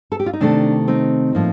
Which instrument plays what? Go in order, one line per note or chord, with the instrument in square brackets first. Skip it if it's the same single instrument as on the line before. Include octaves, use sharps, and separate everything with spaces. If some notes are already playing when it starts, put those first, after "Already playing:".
[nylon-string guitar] A4
G4
F4
D#4
C3 D#3 A3 D4
C4 D#4
A2 F3 A#3